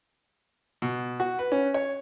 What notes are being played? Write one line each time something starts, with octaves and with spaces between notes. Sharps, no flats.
B2
F#4
B4
C#4
C#5